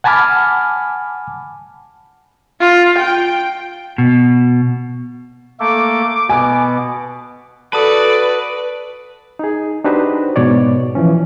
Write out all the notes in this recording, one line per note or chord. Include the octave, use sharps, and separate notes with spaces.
F#5 G#5 A5 B5 D6 F6
F4
G5
B2
A3 A#3 A4 D6
B2 B3 G#5
F#4 A4 B4 D5 A5 D#6
D#4 G#4
D4 D#4 F#4 G4 B4 C5
G#2 B2 C#5 D5
E3 F3 C#4